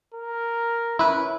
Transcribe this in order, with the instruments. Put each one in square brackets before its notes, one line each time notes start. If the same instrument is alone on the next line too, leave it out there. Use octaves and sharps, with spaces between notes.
[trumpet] A#4
[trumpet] C#4 [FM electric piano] E4 B4